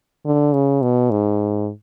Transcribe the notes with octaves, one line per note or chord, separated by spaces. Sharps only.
D3
C#3
B2
G#2